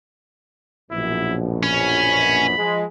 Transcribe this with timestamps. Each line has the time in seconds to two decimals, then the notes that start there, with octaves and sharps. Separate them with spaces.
0.91 A#1 F#2 B2 E4
1.63 C#4 B5
2.58 F3 G#3